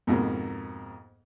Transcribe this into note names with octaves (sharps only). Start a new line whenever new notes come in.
F2 G#2 B2 A#3